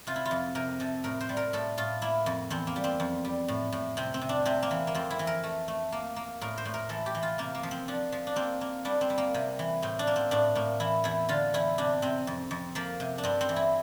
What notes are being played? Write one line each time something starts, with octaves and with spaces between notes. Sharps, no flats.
C3 F4
E4
F4
F2
C3 A#4
C3 A4
A2 A#4
C5
G3
A#4
A2 A4
A2 F4
A#3 E4
F2
E2 C4
A#3
G3
C4
F2
G3
A2
A2
C3 C4
C4
C3
D4
C3 C4
A#3
E3
A#3
F2 C4
E4
E3
A#4
A3
A3
A#3
A#3
A2 A#4
C5
A2
A#4
E3 A4
G4
E3
F4
C3 A#3
A#3
F3
C4
F3 D4
F3
D4
A#3 C4
A#3
G3 D4
C4
G3
A#3
C3
E3
A2 C4
D4
A#3
C4
A2 D4
A2 A#3
E3 E4
E2 E4
D3 F4
E2 E4
C3 D4
C3 C4
F2
F2
F3 A#3
C3
D4
G2 C4
C4
E3
E4